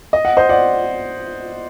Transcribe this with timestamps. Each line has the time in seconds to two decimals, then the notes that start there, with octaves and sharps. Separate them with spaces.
0.13 D#5
0.25 F#5
0.37 C5 D#5
0.49 D5 F#5